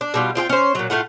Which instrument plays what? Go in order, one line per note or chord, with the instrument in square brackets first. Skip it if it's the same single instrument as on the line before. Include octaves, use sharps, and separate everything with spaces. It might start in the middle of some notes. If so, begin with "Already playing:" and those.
[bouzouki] D4
B2 G3 F4
C4 F4 G#4 G5
C#4 C5
A#2 F#3
A2 A3 F4 F#5